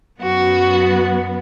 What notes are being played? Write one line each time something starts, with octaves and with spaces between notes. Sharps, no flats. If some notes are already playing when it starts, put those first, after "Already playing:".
F#2 F#3 B3 F#4